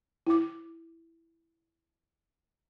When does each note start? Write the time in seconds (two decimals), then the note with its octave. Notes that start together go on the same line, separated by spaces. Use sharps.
0.27 E4 D6